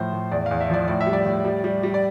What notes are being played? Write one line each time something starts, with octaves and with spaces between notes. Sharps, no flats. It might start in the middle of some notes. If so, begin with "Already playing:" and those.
Already playing: A2 F3 C5
A2
E2 D5
E2 F5
E5
F3 D5
A2 D5
E5
G3
D5
A2
G3
G3
G3
D5